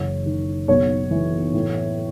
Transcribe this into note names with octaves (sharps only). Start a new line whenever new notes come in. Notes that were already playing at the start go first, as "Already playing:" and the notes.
Already playing: F#1 E3 C#5
D#3
B1 C#5
E3
A2